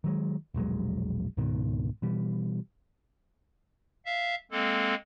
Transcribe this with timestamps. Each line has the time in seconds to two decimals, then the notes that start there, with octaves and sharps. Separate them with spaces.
0.04 D#3 F#3 G#3
0.54 E1 A#1 F#3 G#3
1.37 C#2 G#2 B2 D#3
2.02 B2 E3 G3
4.06 E5 F5
4.51 G#3 A#3 C4 A4